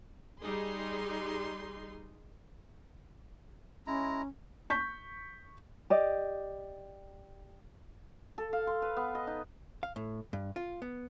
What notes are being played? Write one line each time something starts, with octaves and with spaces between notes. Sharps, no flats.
G3 D#4 G#4 C6
G#3 C#4 E4 A#5
C#6 G6 B6
G4 D5 D#5
A4
F5
C6
B4
B3
D#5
D#4
F5
A2
G2
F4
B3